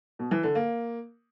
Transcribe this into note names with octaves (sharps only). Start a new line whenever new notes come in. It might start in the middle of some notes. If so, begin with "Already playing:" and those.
B2
E3
D3
A#3